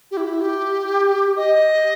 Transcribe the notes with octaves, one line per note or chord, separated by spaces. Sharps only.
G4
E4
G4
D#5